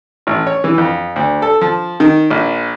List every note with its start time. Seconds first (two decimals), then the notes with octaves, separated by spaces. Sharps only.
0.27 A1
0.47 C#5
0.64 E3
0.78 F2
1.16 D2
1.42 A4
1.61 F3
2.00 D#3
2.31 A#1